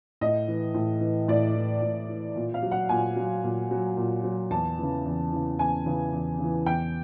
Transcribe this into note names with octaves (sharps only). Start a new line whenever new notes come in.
A2 D#5
E3
A2
E3
A2 D5
E3
A2
E3
A#2
F5
F#3
F#5
A#2 G#5
F#3
A#2
F#3
A#2
F#3
E2 A5
C#3 E3
E2
C#3 E3
E2 G#5
C#3 E3
E2
C#3 E3
E2 G5